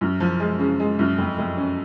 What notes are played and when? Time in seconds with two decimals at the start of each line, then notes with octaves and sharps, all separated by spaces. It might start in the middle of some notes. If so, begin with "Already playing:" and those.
0.01 F#2
0.20 F3
0.40 G#3
0.59 C#3
0.80 G#3
0.99 F#2
1.18 F2
1.38 F2
1.57 C#4